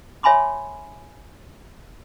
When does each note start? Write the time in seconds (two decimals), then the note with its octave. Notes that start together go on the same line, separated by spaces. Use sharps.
0.23 C#5 E5 G#5 B5 C6 D6